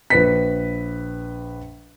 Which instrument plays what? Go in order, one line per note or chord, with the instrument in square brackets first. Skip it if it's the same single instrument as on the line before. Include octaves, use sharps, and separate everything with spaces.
[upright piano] A#1 B4 B6